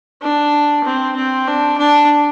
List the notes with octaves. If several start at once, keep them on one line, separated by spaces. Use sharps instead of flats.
D4
C4
C4
D4
D4